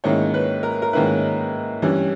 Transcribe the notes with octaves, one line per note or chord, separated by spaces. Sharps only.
G#2 D#3 A#3 C#4 E4 C#5
B4
A#4
A#4
G#2 D#3 A#3 C#4 E4 B4
G2 E3 G3 C#4